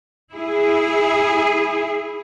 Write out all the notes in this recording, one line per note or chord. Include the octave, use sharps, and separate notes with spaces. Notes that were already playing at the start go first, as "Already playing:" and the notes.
E4 G#4